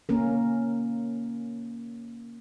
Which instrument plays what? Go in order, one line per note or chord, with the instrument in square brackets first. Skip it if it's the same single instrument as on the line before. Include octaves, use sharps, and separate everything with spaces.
[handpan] A#3 C#4 A#4